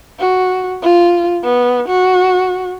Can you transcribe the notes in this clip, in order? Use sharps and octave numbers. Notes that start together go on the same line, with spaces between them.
F#4
F4
B3
F#4